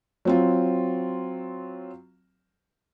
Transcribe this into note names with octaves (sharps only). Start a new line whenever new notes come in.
F#3 C4 F4